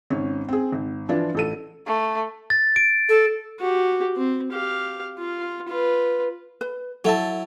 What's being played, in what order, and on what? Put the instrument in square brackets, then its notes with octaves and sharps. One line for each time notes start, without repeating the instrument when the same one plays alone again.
[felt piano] G#1 C#4
C4 G#4
G#1
E3 F3 D4 F4
A1 A4 D#7
[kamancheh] A3
[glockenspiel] A6
D7
[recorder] A4
[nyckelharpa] F#4 G4
C4
G4 F5
F4
F4 B4
[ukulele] B4
[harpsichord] F#3 E4 [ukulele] A4 A5